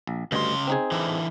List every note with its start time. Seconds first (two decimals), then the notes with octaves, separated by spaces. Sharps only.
0.07 A#1
0.32 D2 G2 C#3 D#5 C6
0.67 C4 D#4 G#4
0.92 D3 E3